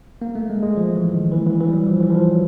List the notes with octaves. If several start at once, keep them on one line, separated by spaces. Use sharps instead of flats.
A#3
A3
G#3
G#3
F3
E3
D#3
E3
E3
E3
G3
F#3
F3
E3
F3
E3
F#3